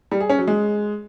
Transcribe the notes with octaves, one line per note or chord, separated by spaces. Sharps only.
G3
G#4
C#4
F#3
G#3